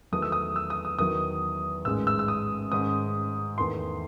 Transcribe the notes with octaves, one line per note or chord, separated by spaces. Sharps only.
E2 D#3 F#3 A3 D#6
E6
D#6
E6
D#6
D#6
E2 D#3 F#3 D#6
A1 G#2 D#3 G#3 E6
E6
E6
D#6
G#2 D#3 G#3 C#4 D#6
E2 D#3 A3 C6